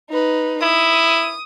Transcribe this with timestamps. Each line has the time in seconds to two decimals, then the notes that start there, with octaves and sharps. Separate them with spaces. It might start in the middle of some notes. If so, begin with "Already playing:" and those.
0.10 D#4 B4
0.63 E4 D#6